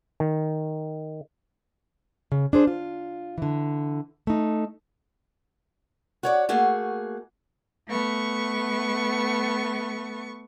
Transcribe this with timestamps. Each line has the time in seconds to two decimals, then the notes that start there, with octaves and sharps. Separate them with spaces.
0.20 D#3
2.32 C#3
2.53 D4 G#4 C5
2.67 F4
3.38 D3 E3
4.27 A3 D#4
6.23 F#4 C#5 D5
6.49 A3 A#3 F#4 G#4
7.90 A3 B3 C#6